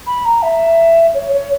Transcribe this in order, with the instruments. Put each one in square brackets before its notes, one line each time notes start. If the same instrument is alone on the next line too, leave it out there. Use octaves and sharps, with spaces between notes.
[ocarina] B5
A#5
E5
C#5
C#5